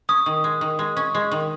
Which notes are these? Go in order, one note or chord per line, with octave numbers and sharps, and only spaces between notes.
C#4 D#6
D#3
G#3
D#3
G#3
C#4
G#3
D#3